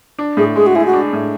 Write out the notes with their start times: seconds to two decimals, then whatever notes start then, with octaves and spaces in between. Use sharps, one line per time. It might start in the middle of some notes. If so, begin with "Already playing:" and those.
0.18 D4
0.37 A2 G#4
0.56 G#3 G#4
0.67 F#4
0.75 E4 G#4
0.86 F#4
0.93 D4
1.13 A2